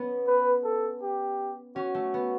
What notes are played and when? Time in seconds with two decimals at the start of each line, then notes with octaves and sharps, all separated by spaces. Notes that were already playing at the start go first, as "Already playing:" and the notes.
Already playing: B3 C#4
0.27 B4
0.64 A4
1.02 G4
1.76 C#4 F#4
1.95 A3
2.14 B3